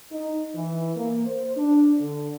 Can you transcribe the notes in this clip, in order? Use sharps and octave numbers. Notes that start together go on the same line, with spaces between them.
D#4
E3
A#3
C5
D4
D3